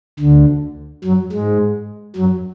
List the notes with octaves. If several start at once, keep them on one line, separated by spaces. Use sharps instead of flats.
D2 D3
F#2 F#3
G#2 G#3
F#2 F#3